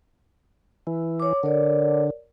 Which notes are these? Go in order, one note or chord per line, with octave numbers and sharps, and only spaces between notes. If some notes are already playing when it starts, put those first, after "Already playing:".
E3
C#5 D6
D3 A#4 C#5 D5